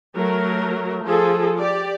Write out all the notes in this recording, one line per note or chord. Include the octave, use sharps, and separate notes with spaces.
F#3 A3 A#4
F3 G#4 A4
G4 D5